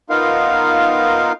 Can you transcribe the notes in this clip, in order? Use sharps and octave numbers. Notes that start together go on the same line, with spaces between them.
B3 D#4 F4 A#4 F5